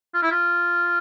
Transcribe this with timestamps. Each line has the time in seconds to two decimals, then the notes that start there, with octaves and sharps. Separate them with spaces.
0.14 F4
0.22 E4
0.32 F4